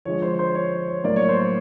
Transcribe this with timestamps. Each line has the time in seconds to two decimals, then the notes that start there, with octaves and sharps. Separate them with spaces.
0.05 D3 F3 G#3 C#5
0.22 C5
0.39 C5
0.55 C#5
0.88 C#5
1.04 A2 F#3 A#3 D5
1.16 C#5
1.29 C5
1.41 C5